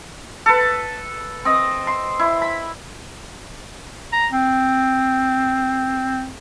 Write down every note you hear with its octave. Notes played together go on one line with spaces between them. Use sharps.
A4 B4
C4 D#5
C6
E4
B5
A#5
C4